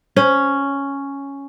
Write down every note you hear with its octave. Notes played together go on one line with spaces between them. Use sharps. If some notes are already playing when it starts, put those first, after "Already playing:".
C#4